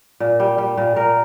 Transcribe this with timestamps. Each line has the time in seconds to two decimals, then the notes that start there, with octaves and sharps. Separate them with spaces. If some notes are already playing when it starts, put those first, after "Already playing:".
0.20 A#2
0.40 G3
0.58 G3
0.77 A#2
0.96 A#2 A#4